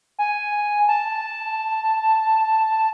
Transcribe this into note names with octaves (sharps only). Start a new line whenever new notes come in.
G#5
A5